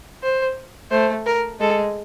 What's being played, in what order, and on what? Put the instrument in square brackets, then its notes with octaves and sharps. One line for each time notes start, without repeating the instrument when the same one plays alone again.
[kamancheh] C5
[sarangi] A3 [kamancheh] C5
[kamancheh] A#4
[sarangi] G#3 [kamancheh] A4